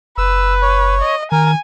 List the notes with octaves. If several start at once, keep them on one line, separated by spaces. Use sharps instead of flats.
F#1 B4 E6
C#5
D#5
D#3 A#4 G#5